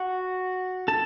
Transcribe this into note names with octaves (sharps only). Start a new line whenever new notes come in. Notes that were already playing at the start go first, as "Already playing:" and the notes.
Already playing: F#4 F#5
A4 A5